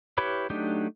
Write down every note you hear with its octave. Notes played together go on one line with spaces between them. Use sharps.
E4 G4 B4 C#5 B5
F#3 A3 D4 D#4 G4